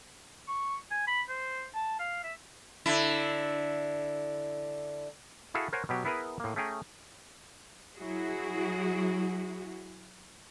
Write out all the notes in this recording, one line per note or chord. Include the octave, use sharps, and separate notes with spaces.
C#6
G#5
B5
C5
A5
F5
E5
D3 E4
E4 F#4 G#4 A4 F5
A#4 C5 C#5 F#5 G#5
B2 F#3 G4
B3 E4 G#4 A#4 B4
A2 A#3
A3 C#4 G#4 G5 A#5
F#3 E4 F#4 G#4